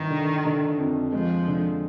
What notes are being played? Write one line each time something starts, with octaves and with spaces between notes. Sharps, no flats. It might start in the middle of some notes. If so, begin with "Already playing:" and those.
Already playing: G1 D#3
D3
D3
F2
F3 G#3
D3